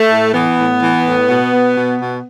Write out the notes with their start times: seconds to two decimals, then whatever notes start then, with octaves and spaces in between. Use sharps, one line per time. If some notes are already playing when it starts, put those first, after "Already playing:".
Already playing: A3
0.10 A2
0.34 E3 B3
0.58 A2
0.81 E3
1.05 A2
1.29 B2
1.52 B2
1.76 B2
2.00 B2